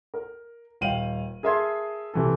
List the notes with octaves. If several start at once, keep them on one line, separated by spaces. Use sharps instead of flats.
A#4
D#1 F5 G5 D#7 F#7
G#4 A#4 E5 A5 C6 G#6
C3 E3 A4